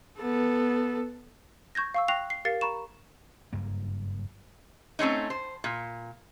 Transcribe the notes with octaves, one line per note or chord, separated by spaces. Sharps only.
B3 A4
C#6 G6 G#6 A#6
F5 C#6 E6
G5 C#6 F#6 A#6 C7 F7
C7
G4 A#4 F5 A6 C7 C#7
A#5 B5 C#6 E7
F#1 G2 A#3
A3 C4 C#4 D#4
C5
A#2